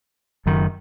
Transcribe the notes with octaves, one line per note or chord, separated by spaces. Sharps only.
F#1 F#2 D#3